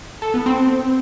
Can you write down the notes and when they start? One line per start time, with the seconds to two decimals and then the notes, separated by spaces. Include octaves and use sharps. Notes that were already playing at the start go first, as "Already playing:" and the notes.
0.22 A4
0.34 B3
0.46 C4